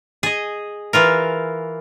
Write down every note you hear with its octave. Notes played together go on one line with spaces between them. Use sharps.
G#4 D#5
E3 F4 A#4